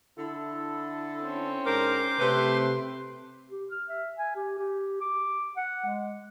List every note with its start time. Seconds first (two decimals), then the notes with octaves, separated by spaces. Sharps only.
0.17 D3 E4 A4
1.22 C4 C#4
1.66 G#2 D4 A#4 C5 D6
2.20 C3 A3 C4 B4 C6
3.50 G4
3.71 F6
3.89 E5
4.18 G#5
4.36 G4
4.58 G4
5.01 D6
5.57 F#5
5.86 G#3